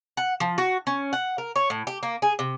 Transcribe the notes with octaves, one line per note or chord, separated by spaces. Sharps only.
F#5
F3
F#4
C#4
F#5
A#4
C#5
A2
G4
A#3
G#4
C3